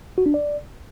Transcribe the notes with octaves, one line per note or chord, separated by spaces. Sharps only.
F#4
D4
D5